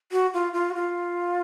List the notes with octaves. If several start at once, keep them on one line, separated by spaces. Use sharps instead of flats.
F#4
F4
F4
F#4
F4